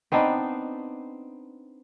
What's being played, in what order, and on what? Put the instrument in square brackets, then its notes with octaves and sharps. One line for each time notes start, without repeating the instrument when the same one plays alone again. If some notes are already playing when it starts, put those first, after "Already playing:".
[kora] B3 C4 D4 D#4